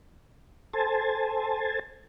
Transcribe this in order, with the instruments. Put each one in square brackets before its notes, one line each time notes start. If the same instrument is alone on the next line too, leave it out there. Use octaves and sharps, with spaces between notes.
[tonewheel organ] A4 C5 G#5 A5